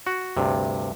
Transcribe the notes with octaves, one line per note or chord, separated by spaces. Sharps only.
F#4
D2 G2 C3